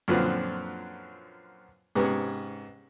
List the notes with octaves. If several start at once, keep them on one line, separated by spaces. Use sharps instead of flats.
F#2 A#2 D3 F3 C4 B4
G#2 C3 B3 C#4